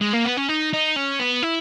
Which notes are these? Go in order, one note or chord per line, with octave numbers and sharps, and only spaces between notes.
G#3
A#3
B3
C#4
D#4
D#4
C#4
B3
E4